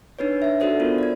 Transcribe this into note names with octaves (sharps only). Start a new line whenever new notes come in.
D4 D#4 B4 C#5
D4 E5
D4 D#4 F#4 A4 C5 D5
B3 F4 A#4
D5 G#6